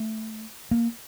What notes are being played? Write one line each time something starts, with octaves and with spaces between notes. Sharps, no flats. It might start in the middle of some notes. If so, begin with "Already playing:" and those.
Already playing: A3
A#3